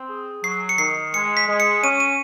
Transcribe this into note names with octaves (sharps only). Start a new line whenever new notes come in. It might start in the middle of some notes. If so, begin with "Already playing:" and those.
Already playing: C4
G#4
F#3 C7
C#7
D#3 C7
G#3 C#7
B6
G#3
C#7
C#4 D#7
D#7